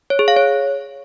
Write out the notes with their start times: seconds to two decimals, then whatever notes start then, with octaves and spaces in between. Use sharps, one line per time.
0.10 C#5
0.19 G#4
0.28 F5
0.37 C#5